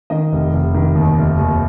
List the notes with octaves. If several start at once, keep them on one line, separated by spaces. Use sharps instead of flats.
D#3 D#5
F1
F1
D#3
D#2
F1
D#2